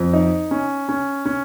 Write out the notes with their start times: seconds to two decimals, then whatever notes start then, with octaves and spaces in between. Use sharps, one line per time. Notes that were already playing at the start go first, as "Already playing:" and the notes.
Already playing: F2
0.13 D#4
0.51 C#4
0.89 C#4
1.26 C#4